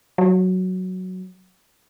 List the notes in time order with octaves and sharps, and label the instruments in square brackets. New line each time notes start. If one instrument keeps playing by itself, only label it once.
[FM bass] F#3